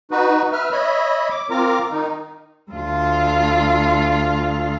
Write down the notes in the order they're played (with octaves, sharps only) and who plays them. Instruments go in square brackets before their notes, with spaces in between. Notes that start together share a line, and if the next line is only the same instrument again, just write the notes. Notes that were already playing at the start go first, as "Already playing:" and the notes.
[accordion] D#4 F#4 B4
B4 E5 F6
C#5 D#5 E5 B5
D6
C4 F4 A#4 A#5 D6
D#3 D#4
[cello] D2 F4